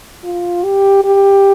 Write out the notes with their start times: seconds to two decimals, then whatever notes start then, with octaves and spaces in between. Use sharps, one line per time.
0.24 F4
0.64 G4
1.04 G4